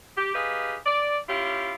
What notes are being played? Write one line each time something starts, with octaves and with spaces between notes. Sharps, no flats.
G4
D#4 G4 G#4 B4 F5
D5
C#4 E4 F4 G4